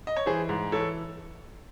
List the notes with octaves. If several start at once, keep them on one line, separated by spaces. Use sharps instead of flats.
D#5
C#5
E3 G#4 C5
G#2
E3 A4 C#5